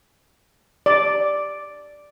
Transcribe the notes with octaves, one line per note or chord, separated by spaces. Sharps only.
D5